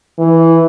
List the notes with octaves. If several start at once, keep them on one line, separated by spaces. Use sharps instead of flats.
E3